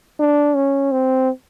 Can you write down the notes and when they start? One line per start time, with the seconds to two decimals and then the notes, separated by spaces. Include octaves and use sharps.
0.19 D4
0.55 C#4
0.91 C4